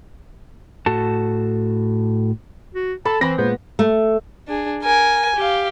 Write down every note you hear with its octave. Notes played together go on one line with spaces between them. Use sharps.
A2 F#4 A4 A5
F#4
A4 A5 B5
E3 C4 B5 A#6
A#2 G#3 B3 C5
A3
D4 G#4
A#4 G#5
G4 F5